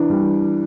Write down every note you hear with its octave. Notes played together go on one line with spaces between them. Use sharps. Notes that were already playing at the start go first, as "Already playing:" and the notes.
Already playing: E3 D4
G3